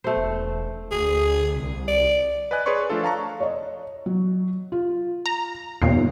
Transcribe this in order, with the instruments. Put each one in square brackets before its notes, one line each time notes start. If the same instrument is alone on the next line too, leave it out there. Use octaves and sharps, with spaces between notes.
[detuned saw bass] B2 [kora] A3 C5
[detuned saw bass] E1
[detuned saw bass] D2 [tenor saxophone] G#4
[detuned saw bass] C2
[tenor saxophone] D5
[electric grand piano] B4 D5 D#5 G#5 F#6
G#4 B4 C#5 D5 C6 C#6
F3 A3 D4 F4 A4
F5 A5 A#5 C#6
[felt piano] C#5 D#5
F#3
F4
[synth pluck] A#5
[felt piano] G1 C7 [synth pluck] D#2 A#2